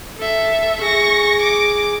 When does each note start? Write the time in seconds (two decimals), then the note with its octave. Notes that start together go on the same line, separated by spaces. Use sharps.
0.17 A4 E5
0.81 G#4 C#6 A#6
1.41 D6